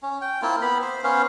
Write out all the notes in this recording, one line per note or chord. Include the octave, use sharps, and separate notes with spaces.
C#4
G5
A#3 C4 E4 F4
B3 B5
C5
B3 C#4 C5 F5